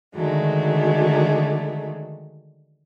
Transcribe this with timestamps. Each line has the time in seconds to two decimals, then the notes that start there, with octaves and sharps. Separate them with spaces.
0.14 D3 D#3 F#3 G#3 A3